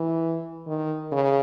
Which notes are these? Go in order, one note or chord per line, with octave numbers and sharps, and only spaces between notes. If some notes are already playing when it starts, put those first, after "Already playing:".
Already playing: E3
D#3
C#3